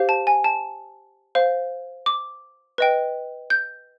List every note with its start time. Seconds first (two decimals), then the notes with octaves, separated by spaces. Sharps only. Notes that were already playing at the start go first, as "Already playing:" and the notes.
Already playing: G4 C5 F5
0.09 A5
0.27 G#5
0.44 A5
1.35 C5 F5
2.06 D6
2.78 B4 D#5 G5
3.50 G6